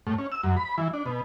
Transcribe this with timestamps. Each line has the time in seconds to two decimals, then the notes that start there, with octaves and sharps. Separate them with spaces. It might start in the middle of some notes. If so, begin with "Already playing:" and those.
0.07 A2
0.18 C#4
0.32 E6
0.43 F#2
0.57 B5
0.78 E3
0.93 D4
1.06 B2